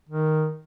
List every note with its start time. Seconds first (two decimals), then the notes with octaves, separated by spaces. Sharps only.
0.09 D#3